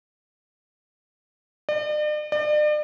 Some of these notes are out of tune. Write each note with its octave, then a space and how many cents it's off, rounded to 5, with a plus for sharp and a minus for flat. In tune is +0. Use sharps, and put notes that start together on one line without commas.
D5 +45
D5 +40